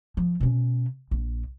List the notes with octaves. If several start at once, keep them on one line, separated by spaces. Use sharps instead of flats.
F3
B2 C#4
A#1